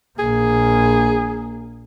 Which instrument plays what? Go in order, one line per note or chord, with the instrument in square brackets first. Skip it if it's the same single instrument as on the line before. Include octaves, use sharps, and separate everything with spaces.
[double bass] A#1 A#3 [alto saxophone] G#4